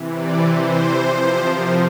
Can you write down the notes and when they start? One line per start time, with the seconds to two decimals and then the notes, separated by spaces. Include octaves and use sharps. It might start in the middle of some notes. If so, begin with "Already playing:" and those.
Already playing: C3 E3
0.14 D5
0.41 C5
0.98 C3 F3
1.54 A#4